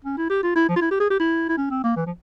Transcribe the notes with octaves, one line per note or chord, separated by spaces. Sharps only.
C#4
E4
G4
F4
E4
F3
F4
E4
G4
G#4
G4
E4
E4
C#4
C4
A#3
E3
F3